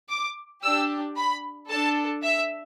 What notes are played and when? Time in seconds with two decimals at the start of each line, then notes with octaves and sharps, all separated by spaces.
0.10 D6
0.63 D4 G4 E6
1.16 B5
1.70 D4 A4 A5
2.23 E5